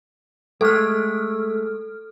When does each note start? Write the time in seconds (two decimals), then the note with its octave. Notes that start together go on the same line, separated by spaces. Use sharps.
0.61 G#3 A3 A4 F6